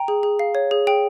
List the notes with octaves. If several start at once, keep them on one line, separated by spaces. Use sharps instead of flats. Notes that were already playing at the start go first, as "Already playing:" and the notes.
Already playing: G5 A#5
G#4
G#4
F5
C#5
G#4
G#4 G5